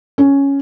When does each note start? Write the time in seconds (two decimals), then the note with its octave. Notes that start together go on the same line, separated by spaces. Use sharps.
0.18 C#4